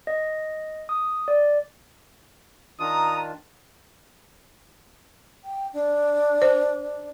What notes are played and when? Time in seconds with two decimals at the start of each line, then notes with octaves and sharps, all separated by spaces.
0.07 D#5
0.89 D#6
1.28 D5
2.80 D#3 D4 F4 A#5 D#6
5.44 G5
5.73 D4
6.42 C5